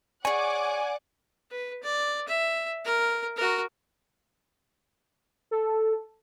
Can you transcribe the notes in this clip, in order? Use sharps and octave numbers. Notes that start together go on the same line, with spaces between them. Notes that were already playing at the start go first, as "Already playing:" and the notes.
G#4 C#5 D5 F#5 G#5 D6
B4
D5
E5
A#4
F#4 A#4
A4